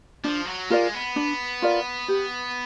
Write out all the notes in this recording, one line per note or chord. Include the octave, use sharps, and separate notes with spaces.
F3 D4
F#3
G#3 F4 A#4 D5
B3
D4
F4 A#4 D5
G4